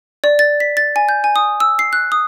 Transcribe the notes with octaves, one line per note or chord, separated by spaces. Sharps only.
D5
A6
B6
A6
G#5
G6
G#5
D#6
E6
C7
F#6
D#6